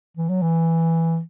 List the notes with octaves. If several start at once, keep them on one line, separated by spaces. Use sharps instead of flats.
E3
F#3
E3